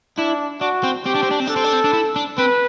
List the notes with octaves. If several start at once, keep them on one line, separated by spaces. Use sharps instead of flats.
D4 E4
D4 F#4
C4
C4 G4
D4
C4
D4
C4
D4 A4
C4
D4
C4
D4
E4
D4
C4 B4